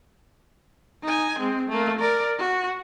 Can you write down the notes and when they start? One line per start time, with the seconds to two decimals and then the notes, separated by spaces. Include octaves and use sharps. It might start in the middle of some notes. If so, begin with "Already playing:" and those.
1.03 D#4 G#5
1.39 G#3 C4
1.69 A3 A#3
1.99 A#4 D5
2.38 F#4